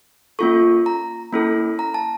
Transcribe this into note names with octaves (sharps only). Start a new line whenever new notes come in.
A#3 C#4 F4 A4 C#6
A#5
A#3 C#4 E4 A4
A#5
A5